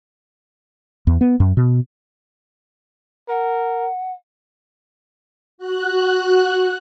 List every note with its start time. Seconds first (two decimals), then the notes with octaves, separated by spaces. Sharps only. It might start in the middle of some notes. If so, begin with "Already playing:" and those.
1.07 E2
1.21 B3
1.40 F#2
1.57 B2
3.28 A#4 F#5
5.58 F#4 F#6